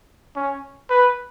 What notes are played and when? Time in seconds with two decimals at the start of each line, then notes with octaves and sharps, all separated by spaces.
0.36 C#4
0.90 B4